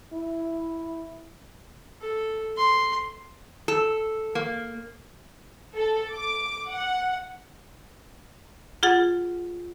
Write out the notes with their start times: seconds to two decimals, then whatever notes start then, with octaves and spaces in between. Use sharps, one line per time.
0.13 E4
2.01 A4
2.57 C6
3.68 A4
4.35 A#3
5.75 A4
6.13 D6
6.69 F#5
8.83 F4 G#4 F#5 A6